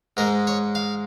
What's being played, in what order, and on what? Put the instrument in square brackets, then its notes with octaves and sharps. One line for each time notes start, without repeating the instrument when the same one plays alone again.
[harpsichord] G#2 G#3 A#4
C#5
F5